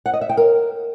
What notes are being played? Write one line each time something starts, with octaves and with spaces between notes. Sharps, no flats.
F#5
D#5
E5
G5
A#4